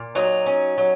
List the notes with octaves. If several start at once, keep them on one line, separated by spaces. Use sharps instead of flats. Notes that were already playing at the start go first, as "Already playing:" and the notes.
Already playing: A#2
F#3 D#4
C#4
F#3